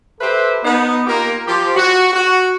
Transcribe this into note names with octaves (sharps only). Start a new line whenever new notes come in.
G4 A4 B4 C5 E5
B3 D#4
A#3 F4 G4 A#4
F3 G4
F#4
F#4